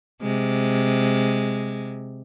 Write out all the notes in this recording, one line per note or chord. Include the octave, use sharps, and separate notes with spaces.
C3 G#3